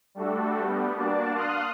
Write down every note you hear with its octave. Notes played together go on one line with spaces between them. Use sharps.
G3 A3 D4 F#4 A4
G3 B3
A#3 D4 F#4 D5 A5
F5 C6 D#6 F6 F#6